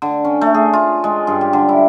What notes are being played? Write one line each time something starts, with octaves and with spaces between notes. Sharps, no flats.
D3
C#4
A3
G#4
F4
G#3
G2
G4
D3
E4